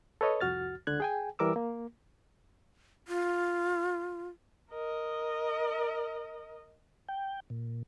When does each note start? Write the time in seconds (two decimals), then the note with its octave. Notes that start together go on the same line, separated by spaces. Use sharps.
0.21 A4 B4 C#5 D#5
0.41 C2 F2 F#4 F6 A6
0.87 C#2 D3 F#6 G#6
1.00 G#4 G5 G#5
1.39 E3 G3 A#4 D6 E6
1.56 A#3
3.08 F4
4.71 A#4 D#5
7.09 G5
7.50 A#2